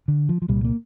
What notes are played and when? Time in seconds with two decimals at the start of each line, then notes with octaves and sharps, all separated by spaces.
0.08 D3
0.29 F3
0.42 F3
0.48 C2 A#2 G3
0.64 A#3